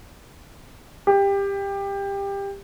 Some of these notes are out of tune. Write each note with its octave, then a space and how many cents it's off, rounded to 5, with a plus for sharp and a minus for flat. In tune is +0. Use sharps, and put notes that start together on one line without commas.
G4 +20